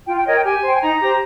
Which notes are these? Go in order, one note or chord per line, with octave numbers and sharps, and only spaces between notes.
F4 G5
G5
A#4 C#5 D#5
G5
G4 G#5
C5 G5
G#5
D#4 A#5
G4 C5